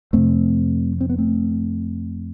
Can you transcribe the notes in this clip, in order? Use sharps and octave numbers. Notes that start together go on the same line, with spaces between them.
F2 C3 A3 C4
C4
B3
A3 C4